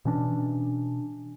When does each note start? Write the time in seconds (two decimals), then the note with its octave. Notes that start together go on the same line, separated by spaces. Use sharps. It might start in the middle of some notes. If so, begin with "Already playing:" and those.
0.05 B2 E3 C#4 D4